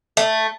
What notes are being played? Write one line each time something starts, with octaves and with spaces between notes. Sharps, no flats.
A3